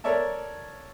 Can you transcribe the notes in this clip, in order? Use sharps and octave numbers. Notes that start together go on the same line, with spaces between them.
A4 A#4 C#5 D5 E5 A5